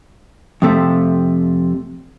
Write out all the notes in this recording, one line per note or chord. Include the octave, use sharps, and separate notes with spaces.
F2 C3 A3